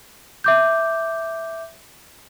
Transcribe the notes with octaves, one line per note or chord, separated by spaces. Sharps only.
E5 D6 G6